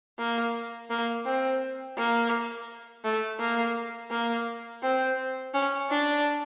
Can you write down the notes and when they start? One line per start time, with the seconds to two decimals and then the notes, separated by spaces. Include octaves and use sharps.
0.19 A#3
0.90 A#3
1.26 C4
1.97 A#3
3.04 A3
3.39 A#3
4.11 A#3
4.82 C4
5.54 C#4
5.89 D4